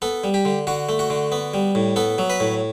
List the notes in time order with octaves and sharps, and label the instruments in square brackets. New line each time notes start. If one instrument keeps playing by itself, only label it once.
[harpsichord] B3 A4
G3
G4
D3
D3 F#4
A3
F#4
D3
B3
G3
A2
B3 A4
F#3
B4
A2